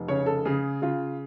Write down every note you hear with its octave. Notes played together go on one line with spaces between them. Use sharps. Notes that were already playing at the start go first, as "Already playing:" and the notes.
Already playing: F1
C#3 C#5
A4
C#3 G#4
C#3 F4